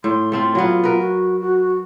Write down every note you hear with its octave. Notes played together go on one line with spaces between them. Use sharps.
A2 C6
A3 C4 F4
F#3 B3 F4
A#4 B4
F#4
F#4